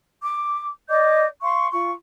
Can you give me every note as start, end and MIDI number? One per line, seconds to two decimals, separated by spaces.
0.21 0.68 86
0.88 1.25 74
0.88 1.25 75
0.88 1.25 86
0.88 1.25 91
1.41 1.67 77
1.41 1.67 84
1.41 1.67 85
1.71 1.89 65
1.71 1.89 85